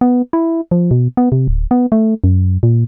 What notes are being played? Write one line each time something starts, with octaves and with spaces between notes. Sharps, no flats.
B3
E4
F3
B2
B3
C3
D1
B3
A3
F#2
A#2